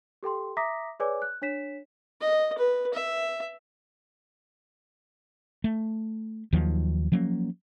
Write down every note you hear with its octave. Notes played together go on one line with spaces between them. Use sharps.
G4 A4 G5 C6
E5 A#5 D6 D#6 A#6 B6
G#4 B4 C#5 D5 G#5 D6
F#6
D4 C#5 B6 E7
D#5
B4
E5
A3
D#2 D#3 F3 F#3
F3 F#3 A#3 C#4